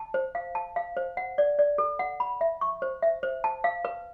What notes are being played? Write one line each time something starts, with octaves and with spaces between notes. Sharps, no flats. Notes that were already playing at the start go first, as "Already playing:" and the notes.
Already playing: A5
C5
F5
A5
F5
C5
F#5
D5
D5
A4
F#5
B5
E5
C#6
C5
E5
C5
A5
F5
B4